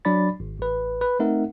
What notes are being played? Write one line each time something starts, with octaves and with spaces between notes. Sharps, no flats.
F#3 D4 D5 B5 A6
G#1
A1 B4
B4
A3 C4 D#4 A#4 E5 F#5